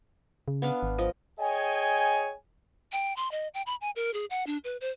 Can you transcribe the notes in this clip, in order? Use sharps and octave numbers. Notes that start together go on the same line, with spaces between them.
C#3
B3 D4 F5
G#1
F3 D#5
G#4 C#5 D#5 G5 G#5
G5
C6
D#5
G5
B5
G#5
A#4
G#4
F#5
D4
B4
C5